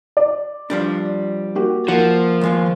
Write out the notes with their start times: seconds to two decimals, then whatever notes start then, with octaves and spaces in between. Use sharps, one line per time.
0.17 D5
0.70 F3 G3 D4
1.55 A#3 F#4 G4
1.88 F3 A#3 F#5
2.41 D#2 G#3 F4